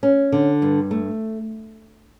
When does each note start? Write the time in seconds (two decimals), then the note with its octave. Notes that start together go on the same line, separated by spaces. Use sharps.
0.03 C#4
0.32 D3
0.62 G2
0.91 A3